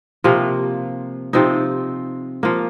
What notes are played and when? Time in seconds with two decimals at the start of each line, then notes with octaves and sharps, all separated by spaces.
0.24 C3 F3 A#3
1.33 C3 F3 C4 D#4
2.43 F3 A#3